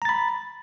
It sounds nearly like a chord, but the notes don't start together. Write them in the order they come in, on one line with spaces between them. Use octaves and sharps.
A#5 A6 B5